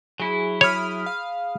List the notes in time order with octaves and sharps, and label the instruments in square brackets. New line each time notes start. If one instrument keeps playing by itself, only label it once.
[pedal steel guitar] F#3 E4 [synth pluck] G#4
[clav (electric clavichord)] C#5 [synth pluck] B5 D#6 F6
[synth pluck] F5